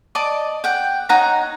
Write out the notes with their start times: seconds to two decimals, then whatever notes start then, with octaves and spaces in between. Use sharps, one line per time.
0.15 D5 D#5 A5 D6
0.64 F#5 G5
1.09 D#4 C#5 F#5 A#5